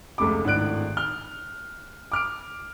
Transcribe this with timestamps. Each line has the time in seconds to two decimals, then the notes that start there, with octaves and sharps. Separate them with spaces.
0.18 F1 C#2 G#3 A3 B5 D6
0.44 G#1 A2 D#3 D4 F#6 D7
0.97 F6 G7
2.12 D6 F6 D7